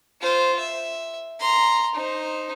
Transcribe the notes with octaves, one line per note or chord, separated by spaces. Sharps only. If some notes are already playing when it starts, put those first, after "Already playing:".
F4 C5
E5
A#5 C6
D#4 C5